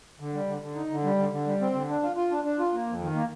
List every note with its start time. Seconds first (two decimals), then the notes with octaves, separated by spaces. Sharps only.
0.20 D3
0.34 G3
0.48 D3
0.62 D3
0.76 D#4
0.90 D3
1.04 G3
1.18 D3
1.32 D3
1.46 G3
1.61 C4
1.75 D3
1.89 D4
2.02 F4
2.16 F4
2.31 D4
2.44 D4
2.59 F4
2.73 A#3
2.87 F2
3.01 D#3
3.15 A#3